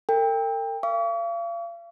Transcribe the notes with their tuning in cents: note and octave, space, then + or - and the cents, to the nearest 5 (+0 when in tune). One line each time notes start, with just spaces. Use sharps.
A#4 -45 G5 +25
F5 -40 C#6 +45